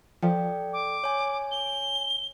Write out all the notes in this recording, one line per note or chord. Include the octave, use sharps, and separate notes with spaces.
F3 A4 D5 G5
D6
C#5 G#5
G7